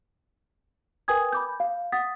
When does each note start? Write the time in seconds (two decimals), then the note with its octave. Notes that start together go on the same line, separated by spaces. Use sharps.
1.08 A#4 B4 G5 G#5 D#6 G#6
1.32 B5 D6 G6
1.60 F5
1.92 F#5 D#6 A6 B6